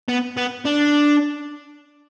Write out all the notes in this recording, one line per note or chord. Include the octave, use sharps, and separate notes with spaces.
B3
B3
D4